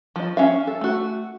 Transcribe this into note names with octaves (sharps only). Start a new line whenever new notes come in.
F3 D#5
C#4 E5 F5
A4
A3 F#4